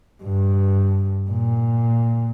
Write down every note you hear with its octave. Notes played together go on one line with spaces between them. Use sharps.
G2
A#2